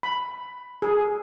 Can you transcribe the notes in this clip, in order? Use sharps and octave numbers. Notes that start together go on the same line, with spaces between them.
B5
G#4